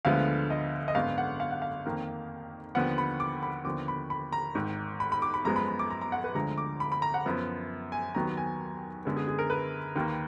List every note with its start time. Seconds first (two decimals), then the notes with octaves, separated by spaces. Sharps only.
0.05 D2 D3 F3 G#3 B3 F5
0.50 D#5
0.88 D#5
0.95 G#1 F#2 D3 G#3 B3 F5
1.18 F#5
1.40 F5
1.51 F#5
1.62 F5
1.86 F2 D#3 A#3
2.75 D#2 D3 F3 B3 F#5
2.98 B5
3.20 D6
3.43 B5
3.65 D#2 D3 F3 B3 D6
3.88 B5
4.10 B5
4.32 A#5
4.55 G#1 G#2 D#3
5.00 B5
5.12 B5
5.22 D6
5.34 B5
5.45 F#2 F3 G#3 B3 A#5
5.56 B5
5.68 B5
5.79 D6
5.90 A#5
6.02 A#5
6.12 F#5
6.24 B4
6.35 D2 D3 F3 G#3 A#5
6.58 D6
6.80 B5
6.92 B5
7.02 A#5
7.14 F#5
7.26 F#2 F3 B3
7.92 G#5
8.15 D#2 D#3 F#3 B3 A#5
8.37 G#5
9.05 F#2 D3 G#3 B3
9.17 G#4
9.28 G#4
9.39 A#4
9.50 B4
9.96 D#2 D#3 A#3